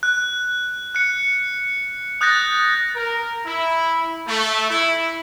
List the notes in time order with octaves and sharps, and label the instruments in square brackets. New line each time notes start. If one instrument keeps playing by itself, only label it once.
[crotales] F#6
F#6 C#7
D#6 F#6 G6 A6 A#6
[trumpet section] A#4
E4
A3
E4